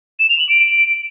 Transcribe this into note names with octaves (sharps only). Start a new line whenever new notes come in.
E7
F7
F#7
D7